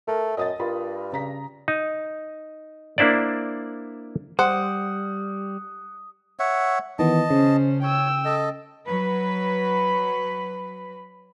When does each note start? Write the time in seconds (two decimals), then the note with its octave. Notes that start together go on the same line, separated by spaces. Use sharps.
0.08 A3 A#4
0.37 F#2 D#5 D#6 A6
0.59 G2 F4 A#4 B5
1.13 C#3 A#5 B6
1.68 D#4
2.98 A#3 D4 E4 C5 D5
4.39 G3 C5 F#5 D#6
6.39 C#5 E5 F#5
6.99 D#3 E3 B3 D#5 A5
7.30 C#3 C#4 C5
7.82 C#5 G5 E6
8.25 A4 D#5
8.85 F#3 B4